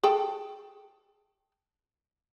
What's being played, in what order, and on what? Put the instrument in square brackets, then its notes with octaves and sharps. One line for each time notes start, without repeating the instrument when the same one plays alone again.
[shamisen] G#4 A4 G5